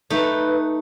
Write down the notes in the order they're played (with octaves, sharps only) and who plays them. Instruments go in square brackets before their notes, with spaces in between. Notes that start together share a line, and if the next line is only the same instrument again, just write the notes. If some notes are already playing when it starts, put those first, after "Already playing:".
[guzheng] A3 D#4 [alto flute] B4